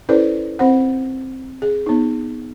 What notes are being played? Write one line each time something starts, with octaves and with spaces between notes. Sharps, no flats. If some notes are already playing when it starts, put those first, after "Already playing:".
C#4 E4 A4 B4 C5 D5
C4 C5 F#5
G#4
B3 D#4